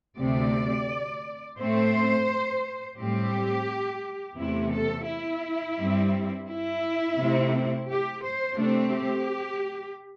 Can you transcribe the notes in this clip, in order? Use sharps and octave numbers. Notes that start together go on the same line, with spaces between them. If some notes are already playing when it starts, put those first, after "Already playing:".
D2 C3 A3 C4 D5
A2 A3 C4 C5
A2 G3 C4 G4
E2 C3 A3 E4
A4
E4
G2 G3 C4
E4
C3 A3 C4
G4
C5
C3 A3 C4 D4
G4